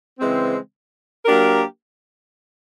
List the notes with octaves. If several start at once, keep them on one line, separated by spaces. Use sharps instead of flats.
C#3 E3 G#3 C4
F#3 A#3 D4 G4 A#4